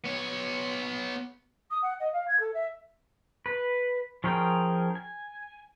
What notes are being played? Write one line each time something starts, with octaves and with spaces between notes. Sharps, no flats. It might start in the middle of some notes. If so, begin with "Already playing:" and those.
B3 C#5
D#6
F#5
D#5
F5
G#6
A4
E5
B4
F3 C#4 G#4 A#4 G5
G#5